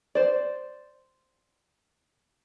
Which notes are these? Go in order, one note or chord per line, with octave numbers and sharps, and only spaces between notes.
C5 D5